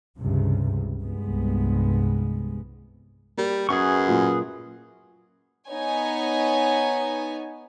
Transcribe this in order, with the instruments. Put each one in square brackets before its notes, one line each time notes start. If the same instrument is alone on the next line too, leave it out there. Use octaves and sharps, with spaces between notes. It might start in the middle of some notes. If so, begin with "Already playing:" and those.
[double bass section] C#2 G2 C3
C2 G2 G#3 B3
[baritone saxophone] G3 [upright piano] A#3
[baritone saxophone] F#2 [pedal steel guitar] G#4 B4 C#6
[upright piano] A#2 F#3 F4
[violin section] B3 D#4 C#5 G#5